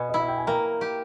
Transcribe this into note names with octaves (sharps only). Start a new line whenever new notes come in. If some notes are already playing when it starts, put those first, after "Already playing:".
Already playing: B2 G#5 B5
E4 D#5
E5
G5
G#5
A#3 G5 A#5
G4